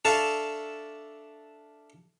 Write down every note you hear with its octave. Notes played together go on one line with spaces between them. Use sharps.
D4 A4 E5 F5 A5 C#6